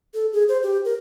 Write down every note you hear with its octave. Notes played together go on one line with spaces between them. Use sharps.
A4
G#4
C5
G4
A#4